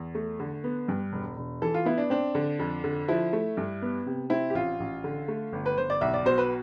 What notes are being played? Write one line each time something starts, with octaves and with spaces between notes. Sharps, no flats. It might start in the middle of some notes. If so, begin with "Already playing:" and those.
Already playing: E2
A3
D3
B3
G2
E1
E1
E3 A4
F4
B3 E4
D4
C4 D4
D3
F2
D3
F3 E4
A3
G2
B3
C3
C4 E4
G4
A1 F4
A1
D3
A3
G1
B4
G1 C5
D5
B1 E5
D5
B2 C5
B4